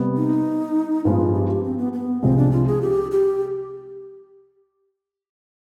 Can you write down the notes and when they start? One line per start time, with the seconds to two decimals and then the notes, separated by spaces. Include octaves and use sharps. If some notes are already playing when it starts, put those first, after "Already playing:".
Already playing: C3 G3 B3
0.17 D#4
1.05 G2 F3 G#3 B3 F4
1.34 G4
1.49 G4
1.64 C4
1.78 B3
1.93 B3
2.22 C2 C3 F3 G#3 C4
2.37 D4
2.51 F4
2.67 G#4
2.82 G4
3.11 G4